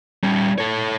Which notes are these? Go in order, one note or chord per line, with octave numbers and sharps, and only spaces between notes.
G3 C#4
A4 C#5